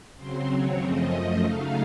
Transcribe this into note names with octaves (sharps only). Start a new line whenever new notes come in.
C#3 F#3 C4 C5
D#2 C#3 F#3 C4 C#5
F#2 C#3 F3 A3 C4 D#5
F#2 F3 A3
C#3 F#3 A3 D#4 F5